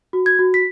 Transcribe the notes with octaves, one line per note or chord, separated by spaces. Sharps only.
F#4
G#6
F#4
B6